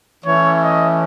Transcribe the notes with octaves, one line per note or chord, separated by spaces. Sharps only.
E3 A3 C#4 C#5
D#5